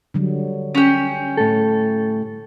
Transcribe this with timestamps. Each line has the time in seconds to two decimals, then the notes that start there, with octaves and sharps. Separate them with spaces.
0.14 D3 F#3 G3
0.75 C#4 G4
1.37 A2 A4